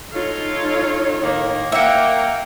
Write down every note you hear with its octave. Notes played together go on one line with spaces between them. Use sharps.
D#4 F4 A4 C#5
A2 D#3 A#3
A#3 E5 F#5 G5